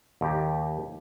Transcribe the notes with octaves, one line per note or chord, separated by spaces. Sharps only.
D#2 G4